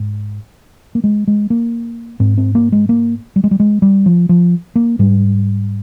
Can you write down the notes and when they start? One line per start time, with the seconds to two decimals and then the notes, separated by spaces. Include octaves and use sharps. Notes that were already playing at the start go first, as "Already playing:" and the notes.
Already playing: G#2
0.95 A#3
1.04 G#3
1.27 G#3
1.50 A#3
2.20 G#2 C4
2.38 C4
2.55 A#3
2.72 G#3
2.89 A#3
3.36 G3
3.44 G#3
3.51 G3
3.60 G#3
3.82 G3
4.06 F3
4.29 F3
4.75 A#3
4.99 G#2 G3